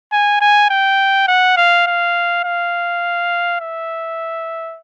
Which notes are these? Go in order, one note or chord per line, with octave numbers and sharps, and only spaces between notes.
G#5
G#5
G5
F#5
F5
F5
F5
E5